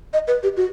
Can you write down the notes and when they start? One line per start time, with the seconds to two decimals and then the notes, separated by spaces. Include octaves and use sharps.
0.13 D#5
0.28 B4
0.43 G4
0.57 F#4